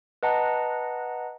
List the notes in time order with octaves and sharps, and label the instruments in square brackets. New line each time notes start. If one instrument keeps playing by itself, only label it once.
[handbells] B4 D#5 F#5 A5 A#5